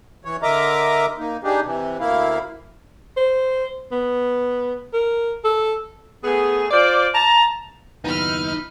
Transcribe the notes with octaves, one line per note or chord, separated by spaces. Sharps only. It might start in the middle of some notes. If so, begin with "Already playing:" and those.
E3 C#5
D3 A#4 D#5 E5 A#5 D6
A#3 D#4
D4 D#4 G4 G#4
C3 E3
D2 A#3 E4 F5
C5
B3
A#4
A4
A3 B3 G#4
F4 C5 D5
A5 A#5
F#1 D#2 B3 D#4 E4 B5 F6